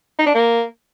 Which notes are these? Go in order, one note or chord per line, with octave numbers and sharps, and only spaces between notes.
D#4
D4
A#3